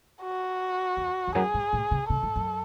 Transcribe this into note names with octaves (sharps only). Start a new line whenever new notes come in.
F#4
E2
E2
F#2 G#4
G#2
A2
C#3
C#3 A4
G#2
F#2